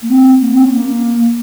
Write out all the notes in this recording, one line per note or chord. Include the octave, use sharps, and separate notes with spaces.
A#3
C4
A#3
C4
C#4
A#3